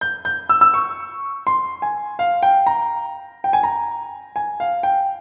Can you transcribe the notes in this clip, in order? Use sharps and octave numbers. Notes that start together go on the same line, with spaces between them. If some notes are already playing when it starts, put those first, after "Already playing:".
G6
G6
E6
E6
C#6
C6
G#5
F5
G5
A#5
G5
G#5
A#5
G#5
F5
G5